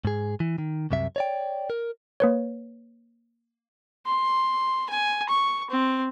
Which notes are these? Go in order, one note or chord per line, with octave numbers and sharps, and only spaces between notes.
G#2 G#4
E3
D#3
C2 F#2 C3 E5
C#5 D5 G5
A#4
A#3 B4 C#5
C6
G#5
C#6
C4